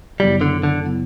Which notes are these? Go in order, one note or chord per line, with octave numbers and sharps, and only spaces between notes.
F#2 C#3 F#3 G3 B3 E4
D3
D3
C#3 F#3 B3 E4